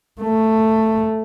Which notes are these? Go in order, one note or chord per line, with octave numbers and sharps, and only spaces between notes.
A3